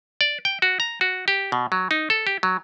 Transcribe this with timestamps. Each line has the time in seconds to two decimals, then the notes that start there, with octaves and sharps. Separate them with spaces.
0.21 D5
0.45 G5
0.62 F#4
0.80 A#5
1.01 F#4
1.28 G4
1.52 B2
1.72 F#3
1.91 D#4
2.10 A4
2.27 G4
2.43 F#3